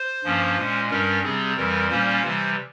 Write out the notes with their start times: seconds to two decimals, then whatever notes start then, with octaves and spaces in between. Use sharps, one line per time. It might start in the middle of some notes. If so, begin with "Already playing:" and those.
Already playing: C5
0.24 G2 F3 A#3 C#4
0.57 A#2 G#3 C#4
0.90 G2 G3 C#4 A#4
1.23 C3 G3 C4 G#4
1.56 F2 E3 G3 A#4
1.90 A#2 G3 A#3 C#4 C5
2.23 C3 E3 G3